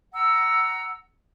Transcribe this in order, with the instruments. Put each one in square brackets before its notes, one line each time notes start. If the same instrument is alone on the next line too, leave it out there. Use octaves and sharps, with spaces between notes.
[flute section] F#5 A#5 E6